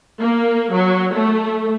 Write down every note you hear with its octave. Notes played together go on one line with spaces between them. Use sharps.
A#3
F#3
A3